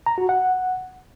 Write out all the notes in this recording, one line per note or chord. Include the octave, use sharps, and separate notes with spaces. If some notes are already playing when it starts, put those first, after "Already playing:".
A#5
F#4
F#5